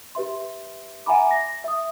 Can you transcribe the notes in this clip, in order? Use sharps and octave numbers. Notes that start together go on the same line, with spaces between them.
G4 B4 E5 C6
E5 F#5 G#5 A#5 B5 D6
A#6
E5 D#6